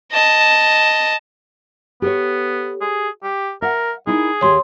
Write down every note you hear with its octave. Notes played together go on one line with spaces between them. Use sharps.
D#5 A5
B3 G4 A4 C#5
G#4
G4
A#4 E5 F#5
D#4 E4 G#4 A#4
D#2 G4 C#5 C6